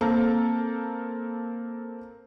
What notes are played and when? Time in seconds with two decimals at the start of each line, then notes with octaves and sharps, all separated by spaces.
0.01 A#3 C4 A4 A#4